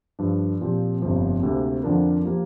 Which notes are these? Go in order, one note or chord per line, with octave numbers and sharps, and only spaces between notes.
G2 F3 D4
A#2 F3 C4 G4
G1 F2 C3 F3 A#3
D2 C3 A#3
F2 D3 F3 D4 A#4
F3 A#3 G4